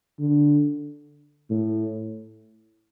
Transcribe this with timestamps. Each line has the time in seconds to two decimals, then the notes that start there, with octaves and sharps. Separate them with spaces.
0.19 D3
1.50 A2